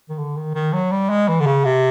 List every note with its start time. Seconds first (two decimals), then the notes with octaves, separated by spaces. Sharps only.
0.09 D#3
0.18 D3
0.36 D#3
0.54 D#3
0.73 F#3
0.91 G3
1.09 G#3
1.28 E3
1.40 D3
1.46 C#3
1.65 C3